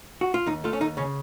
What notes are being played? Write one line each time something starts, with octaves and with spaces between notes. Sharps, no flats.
F#4
F4
D#2 D#4
A3 F4
C#4
D#2 D#4
C#3 C#4